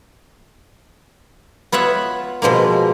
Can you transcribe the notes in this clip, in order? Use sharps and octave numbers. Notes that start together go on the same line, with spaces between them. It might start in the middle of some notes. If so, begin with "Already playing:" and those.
B3 F4 C#5 E5 F#5
B2 F3 G#3 A#3